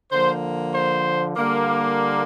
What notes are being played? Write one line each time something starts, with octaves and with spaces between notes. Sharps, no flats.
D3 F3 A#3 C5
C5
D3 G3 A#3